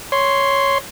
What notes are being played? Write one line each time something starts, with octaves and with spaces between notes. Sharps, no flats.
C#5 C6